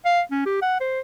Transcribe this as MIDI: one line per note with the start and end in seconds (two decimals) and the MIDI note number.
0.05 0.21 77
0.31 0.42 61
0.46 0.57 67
0.62 0.78 78
0.80 1.00 72